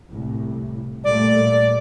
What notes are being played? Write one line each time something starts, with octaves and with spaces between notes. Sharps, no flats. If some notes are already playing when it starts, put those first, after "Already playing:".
C2 A2
A#2 G3 A3 D5